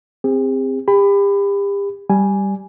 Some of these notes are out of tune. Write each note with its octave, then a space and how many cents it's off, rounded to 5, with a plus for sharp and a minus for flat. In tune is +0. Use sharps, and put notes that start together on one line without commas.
C4 +0 G#4 -45
G4 +35 B5 +20
G3 +0 G#5 +0